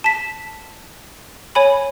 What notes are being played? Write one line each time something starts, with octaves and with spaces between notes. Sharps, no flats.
A5 B6
C#5 G#5 B5